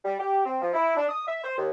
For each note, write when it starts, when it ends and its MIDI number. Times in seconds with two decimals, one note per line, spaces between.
0.05 0.15 55
0.20 0.43 67
0.45 0.59 60
0.61 0.72 53
0.74 0.95 64
0.97 1.05 62
1.09 1.25 87
1.27 1.41 76
1.44 1.57 72
1.57 1.70 39